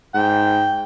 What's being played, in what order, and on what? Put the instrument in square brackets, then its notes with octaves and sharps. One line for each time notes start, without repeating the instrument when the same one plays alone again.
[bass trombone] G#2 [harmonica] G5